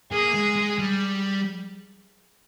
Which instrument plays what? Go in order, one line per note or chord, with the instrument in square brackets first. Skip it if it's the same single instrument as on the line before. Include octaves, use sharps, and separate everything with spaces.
[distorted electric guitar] A#3 [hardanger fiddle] G#4
[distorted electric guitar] G#3
G#3
G3